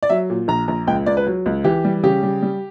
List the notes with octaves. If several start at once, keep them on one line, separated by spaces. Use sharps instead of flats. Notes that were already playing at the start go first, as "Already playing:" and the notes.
D5
F#3 E5
A#2
A#1 A#5
A#1 A#5
C#2 G5
C#2 D5
B4
F#3
C#2
E3 G4
G3
C#3 G4
G3
G3